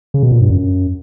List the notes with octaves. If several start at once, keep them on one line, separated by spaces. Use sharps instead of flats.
C#3
B2
A#2
G2
F#2